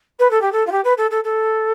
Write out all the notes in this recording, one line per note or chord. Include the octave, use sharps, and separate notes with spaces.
B4
A4
G4
A4
F4
G4
B4
A4
A4
A4